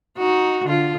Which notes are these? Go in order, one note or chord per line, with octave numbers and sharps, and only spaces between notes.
D#4 F#4
D3 F4